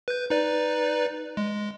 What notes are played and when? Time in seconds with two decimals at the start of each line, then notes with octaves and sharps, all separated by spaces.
0.08 B4 G6
0.30 D#4 B4 D5
1.37 G#3